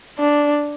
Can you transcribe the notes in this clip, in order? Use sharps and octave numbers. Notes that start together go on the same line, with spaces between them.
D4